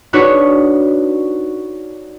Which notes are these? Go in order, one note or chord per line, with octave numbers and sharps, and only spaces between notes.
D4 D#4 F#4 B4 C#5